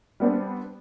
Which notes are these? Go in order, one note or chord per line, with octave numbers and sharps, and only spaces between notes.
G3 B3 C4 D4